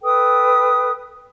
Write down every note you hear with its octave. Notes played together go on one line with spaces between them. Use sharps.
A4 B4 G5 D#6